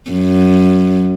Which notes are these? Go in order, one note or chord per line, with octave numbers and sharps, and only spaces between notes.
F#2